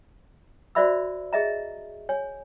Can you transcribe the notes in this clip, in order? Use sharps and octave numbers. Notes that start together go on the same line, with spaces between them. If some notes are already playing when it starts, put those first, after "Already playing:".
F#4 C5 D5 E5 B5 E6
G#4 D#5 E5 A#5
C#5 G#5